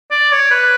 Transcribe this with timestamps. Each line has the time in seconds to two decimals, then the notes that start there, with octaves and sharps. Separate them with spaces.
0.11 D5
0.32 C#5
0.51 B4